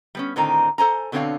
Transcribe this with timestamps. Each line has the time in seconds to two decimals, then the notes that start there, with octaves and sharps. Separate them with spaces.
0.15 G3 B3 C#4
0.36 A2 D3 D#3 C4 D#4 A#5
0.78 A4 C5 G#5 A#5
1.12 B2 D3 C4 D4 C#5 F5